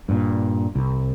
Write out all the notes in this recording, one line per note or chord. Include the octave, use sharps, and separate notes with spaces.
G2 A#2
C2